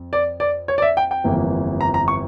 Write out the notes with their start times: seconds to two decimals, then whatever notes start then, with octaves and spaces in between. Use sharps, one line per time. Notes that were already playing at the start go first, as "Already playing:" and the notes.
Already playing: F2
0.13 D5
0.40 D5
0.68 C#5
0.78 D5
0.82 E5
0.97 G5
1.11 G5
1.24 G1 F2 E3 A#3
1.81 A#5
1.94 A#5
2.08 C#6